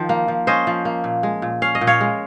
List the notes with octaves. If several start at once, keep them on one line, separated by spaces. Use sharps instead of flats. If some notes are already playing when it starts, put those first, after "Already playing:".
Already playing: D#3 F3
A#3
F3
C#4 C5 D#5
F3
A#3
A#2
G#3
A#2
C#4 F5
D#5
A#2
C#5 F5
G#3